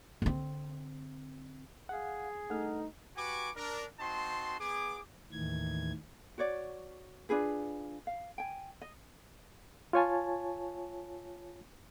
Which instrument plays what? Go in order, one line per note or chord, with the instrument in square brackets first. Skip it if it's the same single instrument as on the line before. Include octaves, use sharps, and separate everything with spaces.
[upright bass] D3 C4
[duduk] G#4 [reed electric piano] F5 F#5
[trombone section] G2 D#4 [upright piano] A3 [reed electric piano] F#5 F6
[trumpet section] F#4 G4 B4 G#5 C#6 D6
D4 A#4
C4 D#4 F#4 A5 C6
B3 G#4 D6
[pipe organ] D#2 A2 D#3 E3 G#6
[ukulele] F#4 C#5 D5
D4 F4 G#4 B4
F5
G5 G#5
D#5
[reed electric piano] F4 C#5 G#5 A5